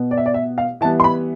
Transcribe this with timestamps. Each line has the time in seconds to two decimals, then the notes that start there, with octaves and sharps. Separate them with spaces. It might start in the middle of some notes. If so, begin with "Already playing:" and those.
Already playing: B2 B3
0.11 D5
0.17 E5
0.26 D5
0.34 E5
0.58 F5
0.81 E3 G3 B3 A5
1.00 C6
1.04 B5